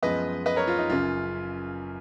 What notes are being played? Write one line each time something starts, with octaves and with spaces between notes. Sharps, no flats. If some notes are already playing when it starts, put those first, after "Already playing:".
F#2 F3 G#3 B3 B4 D#5
B4 D#5
A#4 C#5
F4
D#4
F#1 F#2 C#3 F4